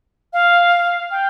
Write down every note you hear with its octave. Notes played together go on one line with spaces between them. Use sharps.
F5
G5